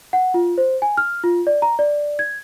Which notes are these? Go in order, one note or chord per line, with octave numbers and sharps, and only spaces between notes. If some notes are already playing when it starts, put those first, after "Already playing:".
F#5
F4
C5
G#5
F6
F4
D5
A#5
D5
G#6